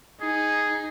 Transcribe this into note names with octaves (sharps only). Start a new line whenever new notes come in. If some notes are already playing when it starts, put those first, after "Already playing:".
D#4 G#4